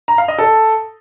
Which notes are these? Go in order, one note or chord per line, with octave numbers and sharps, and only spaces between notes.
A#5
F5
D#5
A4